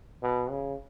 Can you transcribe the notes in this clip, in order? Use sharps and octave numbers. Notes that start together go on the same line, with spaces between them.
B2
C#3